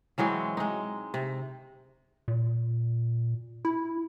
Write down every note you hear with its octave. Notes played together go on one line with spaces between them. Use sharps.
E3 F#3 G#3 C4
G#3 D#4
C3
A#2
E4